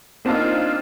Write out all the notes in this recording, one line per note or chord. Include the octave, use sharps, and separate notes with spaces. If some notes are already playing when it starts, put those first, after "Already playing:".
A#3 C4 D4 D#4 F4